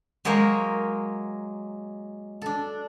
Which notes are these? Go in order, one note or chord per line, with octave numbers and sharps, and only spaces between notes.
F#3 G#3 A#3 A#4 C5 C#5
D4 A4